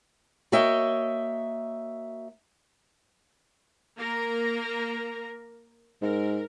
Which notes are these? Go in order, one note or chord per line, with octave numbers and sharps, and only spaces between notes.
A#3 F#4 C#5 D#5 E5 G5
A#3 A#4 A#5
G#2 A#4